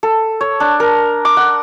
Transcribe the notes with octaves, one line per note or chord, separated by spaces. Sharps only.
A4
C#5
D4
A#4
D6
F#5